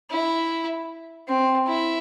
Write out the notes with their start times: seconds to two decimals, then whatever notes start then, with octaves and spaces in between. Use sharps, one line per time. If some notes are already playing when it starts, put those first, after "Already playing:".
0.10 E4
1.28 C4
1.67 E4